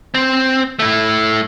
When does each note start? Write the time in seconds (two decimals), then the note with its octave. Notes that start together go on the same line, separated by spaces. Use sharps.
0.14 C4
0.79 A3 E4